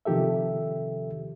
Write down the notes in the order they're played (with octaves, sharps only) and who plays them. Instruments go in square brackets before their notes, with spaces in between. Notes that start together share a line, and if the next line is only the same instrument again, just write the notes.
[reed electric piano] C3 D#3 F3 G4 A4 E5